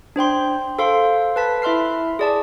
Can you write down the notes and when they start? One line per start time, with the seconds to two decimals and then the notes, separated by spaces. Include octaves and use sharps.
0.16 D4 C5 G5 C6
0.79 A4 C5 F5 C6
1.36 B4 A5 B6
1.62 E4 E5 C6 F6 C7
2.19 G#4 D5 A5